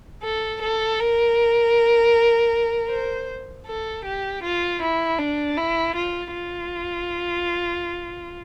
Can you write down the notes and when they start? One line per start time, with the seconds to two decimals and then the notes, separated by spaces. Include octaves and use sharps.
0.23 A4
0.61 A4
1.00 A#4
2.89 C5
3.67 A4
4.05 G4
4.43 F4
4.81 E4
5.19 D4
5.57 E4
5.95 F4
6.33 F4